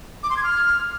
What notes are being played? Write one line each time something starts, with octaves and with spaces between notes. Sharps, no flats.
D6
C6
G#6
F6